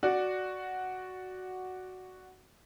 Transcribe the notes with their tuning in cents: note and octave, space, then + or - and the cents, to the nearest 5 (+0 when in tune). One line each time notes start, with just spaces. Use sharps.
F#4 +0 D5 +0